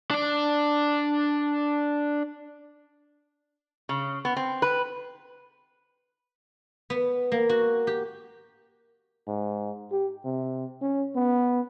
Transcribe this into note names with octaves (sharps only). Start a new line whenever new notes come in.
D4 D5
C#3
B3
C4
B4
B3
A#3
F#4
G4
G#2
G4
C3
C#4
B3